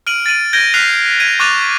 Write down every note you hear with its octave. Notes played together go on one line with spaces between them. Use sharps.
F6 D7 D#7 F#7
A6 D7 D#7 F#7
G6 G#6 A#6 D7 G7
F6 F#6 B6 C7 F7
G#6 D#7
C#6 D6 F#6 A6 D#7 F7